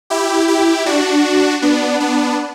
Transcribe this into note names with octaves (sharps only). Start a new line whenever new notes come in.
E4 G4
E4 G4
D4 F#4
B3 D4
B3 D4